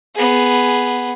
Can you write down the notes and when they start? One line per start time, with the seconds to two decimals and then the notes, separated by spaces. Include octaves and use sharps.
0.15 B3 G#4